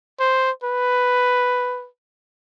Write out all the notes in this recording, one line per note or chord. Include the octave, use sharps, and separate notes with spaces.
C5
B4